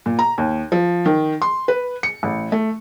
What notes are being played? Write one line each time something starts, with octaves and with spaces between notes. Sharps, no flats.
A#2
A#5
D#2
F3
D#3
C6
B4
C#7
A1
A3